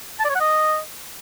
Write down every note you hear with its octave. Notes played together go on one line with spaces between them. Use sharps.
A5
D5
C#5
F#5
D#5